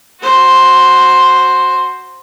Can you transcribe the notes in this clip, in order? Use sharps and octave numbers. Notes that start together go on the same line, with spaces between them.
F#4 C5